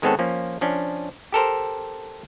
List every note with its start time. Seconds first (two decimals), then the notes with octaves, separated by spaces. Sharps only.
0.02 D#3 G#3 B3 C4 A4 C#5
0.19 F3 A#3 C#4
0.61 F3 C#4 D4
1.32 G4 A4 A#4 C5